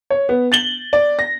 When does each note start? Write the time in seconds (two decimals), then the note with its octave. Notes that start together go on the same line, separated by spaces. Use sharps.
0.10 C#5
0.29 B3
0.52 A6 F#7 G7
0.93 D5
1.19 A#6